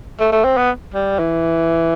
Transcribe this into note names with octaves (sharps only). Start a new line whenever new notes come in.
A3
A3
C4
B3
G3
E3